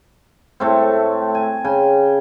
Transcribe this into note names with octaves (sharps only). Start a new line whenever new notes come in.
A2 A3 C4
G#5
C#3 G5 G#5